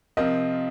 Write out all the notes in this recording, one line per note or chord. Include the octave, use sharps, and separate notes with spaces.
C3 F3 C4 F4 A#4 D#5